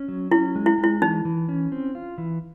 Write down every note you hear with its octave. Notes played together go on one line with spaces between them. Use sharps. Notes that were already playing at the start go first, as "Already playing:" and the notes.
Already playing: C#4
F#3
C#4 E4
G#3
E4
G#3
E4
E3 D#4
E3
C#4
C4
F4
E3